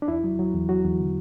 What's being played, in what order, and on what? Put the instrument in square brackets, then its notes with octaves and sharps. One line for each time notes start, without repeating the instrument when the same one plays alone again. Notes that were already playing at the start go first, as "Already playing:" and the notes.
[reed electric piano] D4
E2 E4
F#3
F#3
E2
F#3 F#4
E2
D3